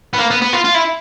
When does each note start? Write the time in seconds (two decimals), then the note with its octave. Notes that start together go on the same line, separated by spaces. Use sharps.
0.13 B3
0.18 A#3
0.30 B3
0.42 B3
0.53 F4
0.64 F4
0.74 E4